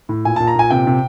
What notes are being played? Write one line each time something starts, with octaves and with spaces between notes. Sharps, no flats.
A2
A#2 G#5
A#2 A5
A#5
A#2 G#5
C3 G5
C3